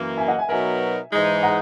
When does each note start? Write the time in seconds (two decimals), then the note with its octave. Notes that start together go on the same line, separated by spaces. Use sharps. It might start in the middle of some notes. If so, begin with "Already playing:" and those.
Already playing: F#2 E3 A#3
0.17 E5 G#5
0.28 D#5 F#5
0.38 E5 G#5
0.49 B2 F#3 B3 D#4 A#4 E5 G#5
1.12 G#2 E3 G#3 D#4
1.43 F#5 A#5